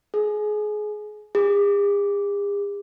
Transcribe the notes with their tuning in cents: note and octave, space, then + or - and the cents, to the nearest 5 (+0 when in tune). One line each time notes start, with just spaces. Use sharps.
G#4 +25
G#4 -45